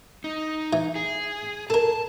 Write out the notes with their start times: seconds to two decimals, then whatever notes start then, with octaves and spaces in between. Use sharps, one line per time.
0.24 D#4
0.73 E3
0.95 G#4
1.70 A4 A#4 A5